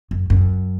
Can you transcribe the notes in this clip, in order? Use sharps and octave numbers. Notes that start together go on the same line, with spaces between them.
F#2
F#2